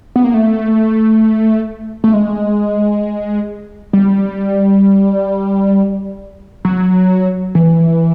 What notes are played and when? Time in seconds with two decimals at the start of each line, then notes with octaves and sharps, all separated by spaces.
0.16 B3
0.24 A#3
0.34 A3
2.04 A3
2.14 G#3
3.93 G3
6.65 F#3
7.55 E3